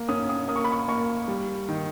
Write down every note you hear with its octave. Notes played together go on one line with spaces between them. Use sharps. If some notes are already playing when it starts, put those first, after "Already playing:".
Already playing: A#3
C#4 D#6
D#6
A#3 D#6
C#6
B5
C#6
A#3 C#6
G3
D#3